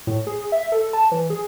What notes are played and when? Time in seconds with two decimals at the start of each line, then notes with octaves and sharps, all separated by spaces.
0.07 A2
0.27 G#4
0.52 E5
0.72 A4
0.93 A5
1.12 E3
1.30 G#4